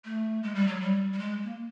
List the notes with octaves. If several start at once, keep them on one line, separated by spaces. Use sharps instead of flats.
A3
G#3
G3
F#3
G3
G3
G#3
A#3